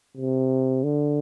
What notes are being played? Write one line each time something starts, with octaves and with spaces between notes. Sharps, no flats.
C3
D3